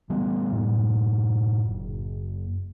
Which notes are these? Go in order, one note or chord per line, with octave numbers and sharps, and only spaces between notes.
E3 G3 B3
F#2 A2
F#1